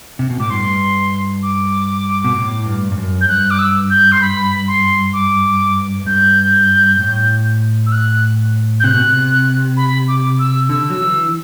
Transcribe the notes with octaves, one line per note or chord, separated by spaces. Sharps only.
C3
B2
A2 D6
G2 C6
D6
B2
A2
G2
G2
F#2
G6
G2 F#6
D6
E6
G6
C6
B5
C6
D6
G2 G6
A2
E6
F#6
G6
C3 F#6
B2
C3
B5
D6
E6
D3 E6
F#3
E3